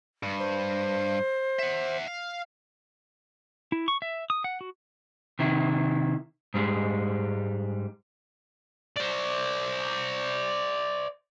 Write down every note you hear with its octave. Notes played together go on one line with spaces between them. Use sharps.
G2
C5
E5 F#5
F5
E4
C#6
E5
D#6
F#5
F#4
C3 D#3 E4
G#2 G3 G#3
C5 D5